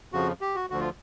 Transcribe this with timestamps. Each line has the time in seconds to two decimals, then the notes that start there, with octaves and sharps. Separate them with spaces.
0.12 F2 C#3 F3 F#4
0.41 G4
0.56 F#4
0.70 D2 D3 F3 F#4
0.80 F4